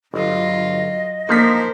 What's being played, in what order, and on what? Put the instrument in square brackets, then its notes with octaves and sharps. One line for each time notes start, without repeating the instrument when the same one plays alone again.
[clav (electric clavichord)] G1 [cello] F#3 F4 [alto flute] D#5
[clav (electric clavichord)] F3 D#4 [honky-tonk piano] A#3 B6 [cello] A#4 C5